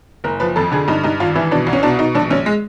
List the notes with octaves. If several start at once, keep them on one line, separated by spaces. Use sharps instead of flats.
F#1 A#4
F3 B4
F2 A4
D3 G#4
G2 D#4
G2 D#4
G#1 F4
E3 E4
B2 D4
C2
C#4
B2 D4
B2 D#4
A#1 D4
A#1 C#4
G#3